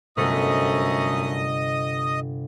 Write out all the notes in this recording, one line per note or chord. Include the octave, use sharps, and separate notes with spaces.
G1 F#2 C3 A3 D#5 D#6